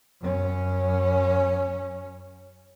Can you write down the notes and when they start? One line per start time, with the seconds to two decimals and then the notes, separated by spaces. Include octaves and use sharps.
0.21 F#2 C#4